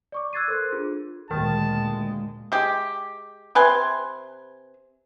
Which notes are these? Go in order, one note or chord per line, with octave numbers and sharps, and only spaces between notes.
D5 C#6 D6
E6 F#6 G#6 A6 C7 D#7
A4 A#4 C5 C6 F#6
D4 F4 G#4
D2 A#2 D#3 G#3 A5
G#3 G4
C3 B4 G#5 C6